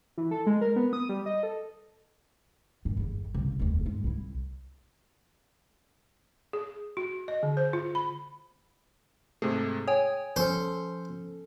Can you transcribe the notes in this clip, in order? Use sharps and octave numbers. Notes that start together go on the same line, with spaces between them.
E3
A4
G#3
A#4
B3
D#6
G3
D#5
A4
G2 A#2
G1 E2
C2 C#3
F1 D#2
G#2 G#3
C2 E4
G#4
F#4
D#5
D3
C5
F4
B5
G#2 C3 A3 G#4
C#5 G5 G#5 D#6
F3 C#4 A4 C5